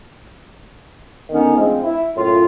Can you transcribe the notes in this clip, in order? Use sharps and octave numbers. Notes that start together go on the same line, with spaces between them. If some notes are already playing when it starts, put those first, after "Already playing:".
D3 D#3 B3 C#4 D#4
F3 G#3 A3 C4 D4
E4
F#2 A2 F4